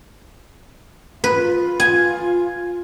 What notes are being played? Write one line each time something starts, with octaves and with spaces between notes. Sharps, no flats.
F4 B4
G#5